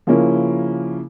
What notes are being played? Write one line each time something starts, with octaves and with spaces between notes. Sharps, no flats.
C#3 F3 A#3 C#4 E4